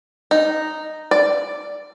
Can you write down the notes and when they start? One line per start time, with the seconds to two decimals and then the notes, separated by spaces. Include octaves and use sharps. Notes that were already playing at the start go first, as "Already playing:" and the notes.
0.31 D#4
1.11 D5